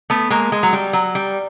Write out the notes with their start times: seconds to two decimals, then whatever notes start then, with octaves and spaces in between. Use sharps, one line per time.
0.10 A3 B3
0.30 G#3 A#3
0.52 G#3
0.63 F#3
0.73 G3
0.93 F#3
1.15 G3